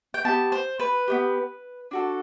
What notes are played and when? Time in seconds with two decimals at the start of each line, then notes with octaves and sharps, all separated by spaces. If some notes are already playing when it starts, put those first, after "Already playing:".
0.14 G5
0.25 B3 D4 G4 A5
0.52 C5
0.80 B4
1.07 B3 D4 G4
1.91 D4 F#4 A4